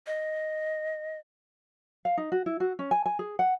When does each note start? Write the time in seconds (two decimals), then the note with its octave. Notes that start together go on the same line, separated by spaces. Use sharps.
0.07 D#5
2.05 F5
2.17 D#4
2.32 F#4
2.46 E4
2.60 F#4
2.79 C#4
2.91 G#5
3.06 G#5
3.19 G#4
3.39 F#5